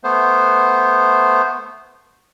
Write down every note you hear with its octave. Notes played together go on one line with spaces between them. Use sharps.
A3 B3 C5